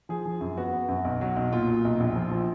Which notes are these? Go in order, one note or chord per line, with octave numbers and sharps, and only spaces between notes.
F3 G#4
F3
F#2
B3 F#4
B3
F#2
B1
F#3
B1
A#2 F4
A#2
B1
A#1
F3
F3